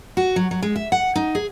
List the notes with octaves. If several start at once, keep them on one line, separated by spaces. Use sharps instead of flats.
F#4
F#3
F#3
G#3
E5
F#5
D#4
G#4